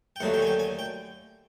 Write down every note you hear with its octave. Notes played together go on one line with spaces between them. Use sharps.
G5
D#2 D3 F#3 A3 F#5
G5
G#5
G5
G#5
G5